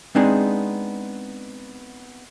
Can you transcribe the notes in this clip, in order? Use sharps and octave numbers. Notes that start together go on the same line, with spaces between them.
G#3 B3 C4 D4 D#4 G#4